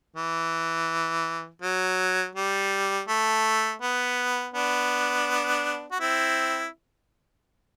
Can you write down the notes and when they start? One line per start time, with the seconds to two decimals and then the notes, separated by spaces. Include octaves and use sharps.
0.16 E3
1.62 F#3
2.35 G3
3.08 A3
3.82 B3
4.54 B3 D4
5.91 F#4
6.00 C4 E4